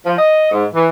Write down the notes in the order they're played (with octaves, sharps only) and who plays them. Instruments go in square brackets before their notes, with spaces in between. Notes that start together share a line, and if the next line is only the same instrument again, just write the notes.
[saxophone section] F3
D#5
G#2
E3